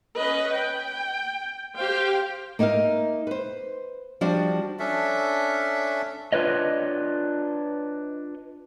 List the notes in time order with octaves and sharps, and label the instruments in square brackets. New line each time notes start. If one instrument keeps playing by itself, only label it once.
[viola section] C#4 B4 D#5
G5
G4 C5 F5 G5
[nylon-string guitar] A#3 D#4 A#4 E5 F5
B4 C5
F3 G3 D4 F#4
[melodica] C#4 D4 A4 E5
[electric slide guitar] D4 F4 B4 C#5 D#5